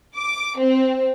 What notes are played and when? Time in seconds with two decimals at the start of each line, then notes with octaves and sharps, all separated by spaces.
0.16 D6
0.58 C4